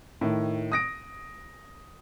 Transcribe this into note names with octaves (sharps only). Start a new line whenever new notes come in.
A2 D#3
D#6 A#6 D7